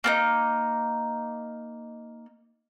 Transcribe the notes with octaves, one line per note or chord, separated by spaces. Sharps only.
A#3 D4 D#4